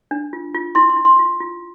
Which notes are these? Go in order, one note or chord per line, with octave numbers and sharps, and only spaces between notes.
D4
F4
F4
E4 C6
C6
E4
C6
F4
F4